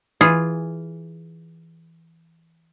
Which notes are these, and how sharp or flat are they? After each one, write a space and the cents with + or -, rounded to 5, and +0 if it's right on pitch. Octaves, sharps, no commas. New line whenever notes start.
E3 +0 F4 +0 G#4 -5